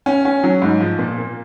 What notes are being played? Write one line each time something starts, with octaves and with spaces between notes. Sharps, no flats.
C#4
C#4
F#3
G#2
F3
A#2
A#3